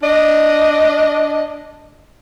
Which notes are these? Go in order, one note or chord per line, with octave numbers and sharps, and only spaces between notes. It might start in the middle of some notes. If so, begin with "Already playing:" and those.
D4 D#5